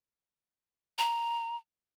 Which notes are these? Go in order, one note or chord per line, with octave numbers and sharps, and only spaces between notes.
A#5